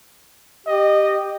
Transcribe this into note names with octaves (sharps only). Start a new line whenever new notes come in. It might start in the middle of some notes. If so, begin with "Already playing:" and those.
G4 D#5